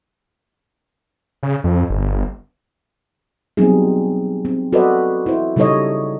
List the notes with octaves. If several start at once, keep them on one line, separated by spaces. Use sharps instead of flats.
C#3
F2
G1
F#3 G3 B3 C4 D#4 G#4
C4
F#4 A4 B4 C5 D5 D#5
E4 C5
C#3 G3 D#4 A4 C#5 D#5